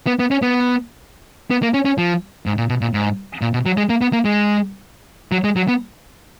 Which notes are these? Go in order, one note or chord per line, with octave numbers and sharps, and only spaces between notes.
B3
B3
C#4
B3
B3
A#3
C#4
C#4
F3
G#2
A#2
B2
A#2
G#2
A#2
B2
F#3
G#3
A#3
B3
A#3
G#3
F#3
G#3
F#3
B3